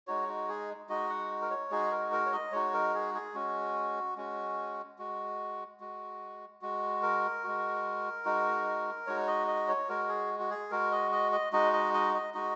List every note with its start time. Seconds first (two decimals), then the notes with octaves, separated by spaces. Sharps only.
0.07 G#3 D#4 F#4 C#5
0.28 F#4
0.49 G#4
0.89 G#3 D#4 F#4 D#5
1.09 F#5
1.42 A#4
1.50 C#5
1.71 G#3 D#4 F#4 G#4
1.92 A#4
2.12 A#4
2.26 C#5
2.32 D#5
2.52 G#3 D#4 F#4 C#5
2.73 A#4
2.94 G#4
3.14 G#4
3.34 G#3 C#4 F#4
4.17 G#3 C#4 F#4
4.99 G#3 F#4
5.80 G#3 F#4
6.62 G#3 F#4
7.02 A#4
7.44 G#3 F#4
8.25 G#3 D#4 F#4
9.07 G#3 D#4 F#4 C#5
9.27 D#5
9.47 D#5
9.68 C#5
9.89 G#3 F#4 A#4
10.09 G#4
10.40 F#4
10.50 G#4
10.71 G#3 F#4 A#4
10.91 D#5
11.12 D#5
11.32 D#5
11.52 G#3 D#4 F#4 D#5
11.73 D#5
11.94 D#5
12.14 D#5
12.34 G#3 D#4 F#4 D#5